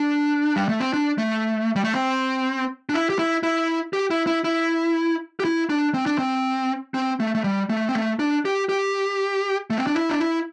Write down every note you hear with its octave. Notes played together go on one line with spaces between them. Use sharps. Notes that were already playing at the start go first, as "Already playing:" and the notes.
Already playing: D4
G3
A3
C4
D4
A3
G3
A3
C4
D4
E4
G4
E4
E4
G4
E4
E4
E4
G4
E4
D4
C4
D4
C4
C4
A3
A3
G3
A3
C4
A3
D4
G4
G4
A3
C4
D4
E4
D4
E4